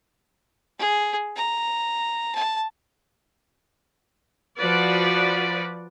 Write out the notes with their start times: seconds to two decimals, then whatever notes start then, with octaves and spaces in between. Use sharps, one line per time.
0.79 G#4
1.36 A#5
2.35 A5
4.59 F3 F#4 B4 D5